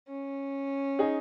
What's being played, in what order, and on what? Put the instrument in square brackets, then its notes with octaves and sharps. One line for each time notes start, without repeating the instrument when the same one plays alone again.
[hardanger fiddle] C#4
[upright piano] D#4 G#4